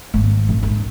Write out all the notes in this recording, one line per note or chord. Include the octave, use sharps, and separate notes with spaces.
G#1
A1
G#2